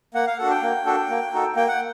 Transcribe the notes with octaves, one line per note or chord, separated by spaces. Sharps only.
A#3 F#5
F5
D4 F#4 A4 F#5
G5
A#3
D4 F#4 A4
A#3
D#4 F#4 A4
A#3 G5
F#5